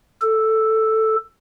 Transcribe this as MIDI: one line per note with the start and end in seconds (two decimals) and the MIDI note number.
0.22 1.16 69